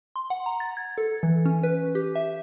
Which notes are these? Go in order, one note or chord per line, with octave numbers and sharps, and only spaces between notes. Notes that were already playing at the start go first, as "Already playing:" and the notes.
C6
F#5
A#5
A6
G#6
A4
E3
C#4
B4
G4
E5